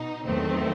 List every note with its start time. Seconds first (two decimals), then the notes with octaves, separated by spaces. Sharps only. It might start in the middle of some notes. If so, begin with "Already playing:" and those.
Already playing: B2 D#4
0.26 E2 D#3 F#3 A3 C4